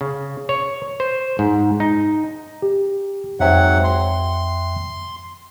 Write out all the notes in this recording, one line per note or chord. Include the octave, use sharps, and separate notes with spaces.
C#3
C#5
C5
G#2
D#4
G4
F2 G#2 F#3 E5 F#5 G5
C6